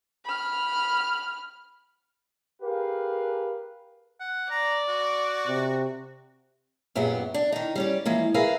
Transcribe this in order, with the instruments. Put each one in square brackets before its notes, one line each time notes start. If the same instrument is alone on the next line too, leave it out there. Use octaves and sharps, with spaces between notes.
[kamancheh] B5 F6
[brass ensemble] G4 G#4 A#4 B4 F5
[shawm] F#5
[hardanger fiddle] D5 [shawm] A#5
[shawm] F#4
[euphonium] C3
[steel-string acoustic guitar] F#2 A#2 B3 G4 G#4
D4
D#3 D#4
G3 C#4 D5
E3 F3 G#3 A#3
G#4 A#4 B4 E5 F5 G#5